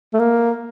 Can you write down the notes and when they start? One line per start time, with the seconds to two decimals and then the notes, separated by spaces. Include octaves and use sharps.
0.13 A3
0.19 A#3